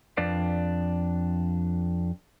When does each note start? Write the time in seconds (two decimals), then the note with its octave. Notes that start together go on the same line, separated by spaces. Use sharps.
0.17 F2 D4 B4 D5 F5